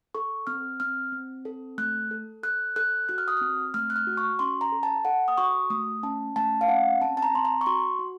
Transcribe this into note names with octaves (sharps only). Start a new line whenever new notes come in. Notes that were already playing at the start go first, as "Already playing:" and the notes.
A4 C#6
C4 F6
C4 F6
C4
A4
A3 F#6
A4
A4 F#6
A4 F#6
F#4 F#6
F6
D#6
C4 F6
A3 F6
F#6
F6
F#4
C#6
C#4 C6
A#5
A4
A5
A4 F#5
D#6
F#4 C#6
A3 D#6
C#4 A5
A3 A5
F5
C#4 F#5
C4 A5
A5
A#5
C4 C6
A#5
C#6
F#4 C6
F#4